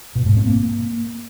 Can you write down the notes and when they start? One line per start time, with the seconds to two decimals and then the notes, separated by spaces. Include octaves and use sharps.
0.15 B2
0.26 G#2
0.37 C4
0.47 A#3